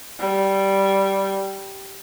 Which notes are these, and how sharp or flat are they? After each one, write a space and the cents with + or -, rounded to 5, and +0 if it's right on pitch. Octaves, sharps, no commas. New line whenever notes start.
G3 -10